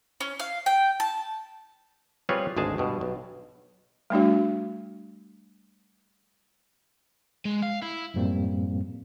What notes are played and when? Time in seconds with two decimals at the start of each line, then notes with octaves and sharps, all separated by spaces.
0.21 C#4
0.40 F5
0.66 G5
1.00 A5
2.29 G3 C4 F4 G#4 B4 C#5
2.57 G#1 D2 G#3 G#4 A5
2.78 G2 B2
3.01 B1
4.10 G3 A3 D4 F#4
7.45 G#3
7.63 F5
7.82 E4
8.14 F#2 A2 F3 G3 A#3 C4